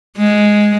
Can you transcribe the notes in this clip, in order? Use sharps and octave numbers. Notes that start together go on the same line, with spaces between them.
G#3